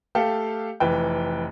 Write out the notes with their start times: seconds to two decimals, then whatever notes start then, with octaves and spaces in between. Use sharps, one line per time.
0.15 A3 G4 A4 F5 G5
0.80 F1 E3 B4 G5